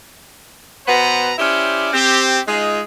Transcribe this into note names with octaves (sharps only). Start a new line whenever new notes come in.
B2 B3 B4 C5 A#5
C#4 E4 G4 C5 D5
C4 G4
G#3 D#4 F4 G#4